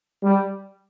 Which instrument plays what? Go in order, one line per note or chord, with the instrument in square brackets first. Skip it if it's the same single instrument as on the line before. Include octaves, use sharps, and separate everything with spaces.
[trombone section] G3